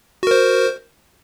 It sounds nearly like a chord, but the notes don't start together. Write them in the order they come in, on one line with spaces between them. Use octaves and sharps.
F#4 A#4 C5